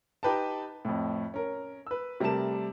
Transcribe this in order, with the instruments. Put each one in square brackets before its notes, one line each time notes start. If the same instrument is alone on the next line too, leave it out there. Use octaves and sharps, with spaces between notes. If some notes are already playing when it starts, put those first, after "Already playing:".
[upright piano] D#4 G4 B4 G5 A5
F2 A2
C#4 A#4
B4 E6
C3 G3 A3 A#4 A5 E7